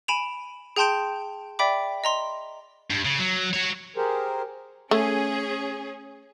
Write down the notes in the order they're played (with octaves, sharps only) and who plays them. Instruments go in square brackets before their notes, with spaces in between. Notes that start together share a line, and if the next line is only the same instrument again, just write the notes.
[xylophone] G#5 B5 D7 E7 F7
G#4 G5 A5 C6 G6 D7
D5 E5 G5 B5 D6
D#5 A#5 C6
[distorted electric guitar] G2
C#3
F#3
F#4 C#5
[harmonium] G4 G#4 A#4 C5
[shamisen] A3 [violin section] C#4 G#4